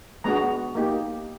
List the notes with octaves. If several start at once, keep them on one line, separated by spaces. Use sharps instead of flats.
G#3 B3 D4 F#4 A#5
A#3 D#4 G4